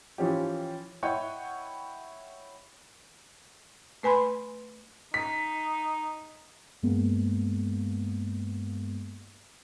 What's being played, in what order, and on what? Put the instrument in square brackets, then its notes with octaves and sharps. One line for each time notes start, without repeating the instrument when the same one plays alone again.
[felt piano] E3 F3 C#4 G4
E4 C#5 D#5 F#5 G5 C#6
[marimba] A3 B4 G#5 B5 C6
[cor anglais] D#4 [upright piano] B6
[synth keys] G2 G#3 A#3 B3